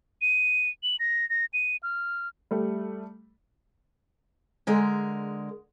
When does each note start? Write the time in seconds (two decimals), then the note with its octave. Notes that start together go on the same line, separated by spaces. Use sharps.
0.22 D#7
0.83 F#7
1.00 A#6
1.30 A#6
1.53 D#7
1.83 F6
2.51 G3 A3
4.67 D3 G#3 A#4